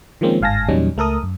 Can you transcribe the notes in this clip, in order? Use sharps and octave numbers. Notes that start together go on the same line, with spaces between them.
D#3 F3 G#3 A#3 C4 C#4
G1 G#2 F5 G#5 A5 A#6
E2 A#2 F#3 G3 C#4 D#4
C#2 A3 A4 A#4 D#6
F#2